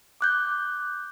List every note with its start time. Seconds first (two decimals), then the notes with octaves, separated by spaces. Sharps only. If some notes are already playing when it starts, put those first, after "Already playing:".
0.21 D6 F#6 G6